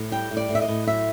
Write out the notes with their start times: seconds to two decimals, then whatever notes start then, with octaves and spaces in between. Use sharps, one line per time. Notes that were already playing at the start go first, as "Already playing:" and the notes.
Already playing: A2
0.12 G3 G5
0.31 A2
0.37 D5
0.49 A2
0.55 E5
0.62 D#5
0.68 A2
0.87 F#3 E5